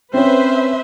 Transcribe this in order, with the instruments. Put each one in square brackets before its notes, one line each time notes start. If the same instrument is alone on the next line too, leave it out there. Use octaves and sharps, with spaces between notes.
[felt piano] C4 C#4 [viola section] B4 C5 E5